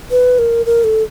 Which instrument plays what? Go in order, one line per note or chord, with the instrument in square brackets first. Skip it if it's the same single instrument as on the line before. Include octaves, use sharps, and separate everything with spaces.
[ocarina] B4
A#4
A#4
A4